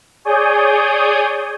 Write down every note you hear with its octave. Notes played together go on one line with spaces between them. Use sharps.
G#4 C#5 D5 G#5 D#6 G6